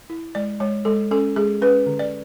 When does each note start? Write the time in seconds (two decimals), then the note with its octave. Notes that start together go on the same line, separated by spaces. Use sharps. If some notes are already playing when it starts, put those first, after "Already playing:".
0.10 E4
0.35 G#3 D5
0.60 G#3 C#5
0.85 G#3 A4
1.11 C#4 A4
1.36 G#3 G#4
1.62 C#4 B4
1.86 D3
1.99 D5